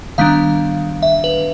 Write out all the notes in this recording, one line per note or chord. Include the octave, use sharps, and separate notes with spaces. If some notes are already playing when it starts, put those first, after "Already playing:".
D#3 G3 B3 D4 F5
E5
B4